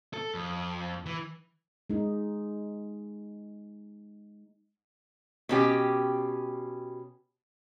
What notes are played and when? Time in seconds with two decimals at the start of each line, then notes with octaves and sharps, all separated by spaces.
0.14 A4
0.34 F2
1.06 E3
1.90 G#3 D#4
5.49 B2 C#4 G4